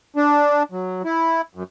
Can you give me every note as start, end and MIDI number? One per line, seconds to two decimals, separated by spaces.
0.16 0.63 62
0.72 1.02 54
1.05 1.41 64
1.55 1.63 42